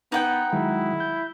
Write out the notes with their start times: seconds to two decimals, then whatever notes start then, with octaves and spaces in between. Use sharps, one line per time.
0.12 B3 D#4 F#5 G5
0.53 D#3 F#3 G#3 E4
1.00 G6